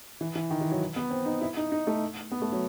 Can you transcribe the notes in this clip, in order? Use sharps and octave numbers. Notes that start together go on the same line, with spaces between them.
E3
E3
D#3
E3
F#3
B3
C4
D#4
E4
D#4
D#4
A3
B3
A3
F#3